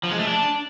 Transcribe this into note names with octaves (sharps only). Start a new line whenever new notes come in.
F3
G#3
A3
D4